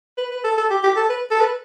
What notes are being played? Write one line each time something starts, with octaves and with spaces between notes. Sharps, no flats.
B4
B4
A4
A4
G4
G4
A4
B4
A4
B4